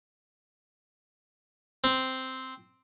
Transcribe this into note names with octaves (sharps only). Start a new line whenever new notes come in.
C4